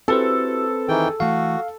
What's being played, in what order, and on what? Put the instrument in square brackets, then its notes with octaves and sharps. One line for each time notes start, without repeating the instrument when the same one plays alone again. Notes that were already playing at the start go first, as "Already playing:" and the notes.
[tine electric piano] C4 B4 C5 [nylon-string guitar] E4 F#4 G4 [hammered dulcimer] A4
[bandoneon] D#3 E3 G5 [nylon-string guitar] G#4
[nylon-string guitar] E3 A3 [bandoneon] F#4 [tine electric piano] F5